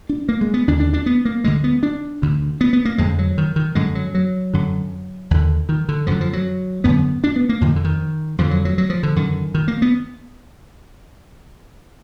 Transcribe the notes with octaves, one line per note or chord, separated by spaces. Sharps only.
D4
A#3
G#3
B3
D#2 D3 D4
D4
D4
B3
A#3
D2 D3 G#3
B3
D4
D2 D3
B3
B3
A#3
F2 D3 G#3
F#3
D#3
D#3
F#2 D3 G#3
F#3
F#3
F#2 D3
D#2 D3
D#3
D3
F#2 D3 F3
F3
F#3
F#2 D3 B3
D4
B3
A#3
F2 D3 F3
D#3
D3
D#3
F2 D3 F3
F#3
F#3
F#3
F3
D3
F#2 D3 D#3
D#3
A#3
B3